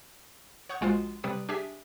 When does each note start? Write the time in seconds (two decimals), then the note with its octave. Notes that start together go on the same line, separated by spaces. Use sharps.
0.69 C#5 F#5 C#6 D#6 G6
0.81 A#1 G#3 F4 F#4 C5 C7
1.24 C3 G3 B4 D#6 D7
1.49 D4 G4 G#4 E5 G#5 B6